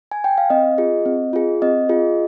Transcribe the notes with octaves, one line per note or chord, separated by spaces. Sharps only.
G#5
G5
F5
C4 D#5
F4 G#4
C4
F4 G#4
C4 D#5
F4 G#4